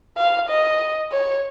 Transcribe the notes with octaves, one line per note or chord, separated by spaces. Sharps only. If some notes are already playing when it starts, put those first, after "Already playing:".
F5
D#5
C#5